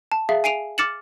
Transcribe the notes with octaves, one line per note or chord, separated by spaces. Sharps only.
A5
G#4 E5 F5
G#5 C7 D7 D#7 F7
D6 F6 A6 C#7 E7 F#7